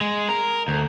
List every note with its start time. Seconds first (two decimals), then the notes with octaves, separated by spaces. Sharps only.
0.01 G#3
0.29 A#4
0.68 D2